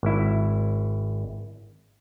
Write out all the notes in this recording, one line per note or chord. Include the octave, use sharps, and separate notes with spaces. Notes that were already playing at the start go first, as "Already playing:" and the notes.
G#1 E4